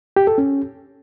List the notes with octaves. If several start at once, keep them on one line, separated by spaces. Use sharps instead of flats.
G4
A4
C#4